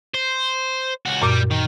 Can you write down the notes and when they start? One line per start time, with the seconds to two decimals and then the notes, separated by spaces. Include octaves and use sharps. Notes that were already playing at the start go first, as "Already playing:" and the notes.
0.15 C5
1.06 C#2 F#4
1.22 F#2 A#2 G3 D6
1.51 D#3